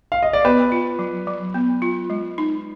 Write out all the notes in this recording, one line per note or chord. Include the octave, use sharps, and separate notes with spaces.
F5
D#5
D5
B3 B4
F4
F#3
F#3
B3
F4
G#3
D#4